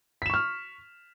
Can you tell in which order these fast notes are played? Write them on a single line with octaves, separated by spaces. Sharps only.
B6 E7 C#6 F6